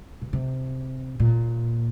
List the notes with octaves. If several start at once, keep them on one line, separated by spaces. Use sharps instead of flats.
B2
C3
A#2